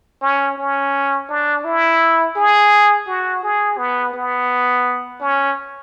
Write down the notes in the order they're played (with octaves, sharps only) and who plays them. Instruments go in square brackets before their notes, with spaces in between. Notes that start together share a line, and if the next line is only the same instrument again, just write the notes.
[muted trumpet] C#4
C#4
D4
E4
G#4
F#4
G#4
B3
B3
C#4